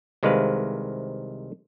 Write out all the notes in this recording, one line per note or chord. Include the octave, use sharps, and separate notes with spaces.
C2 C3 D#3 G#3 B4 F5